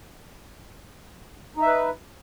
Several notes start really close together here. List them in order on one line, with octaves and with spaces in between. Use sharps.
D#4 E5 B4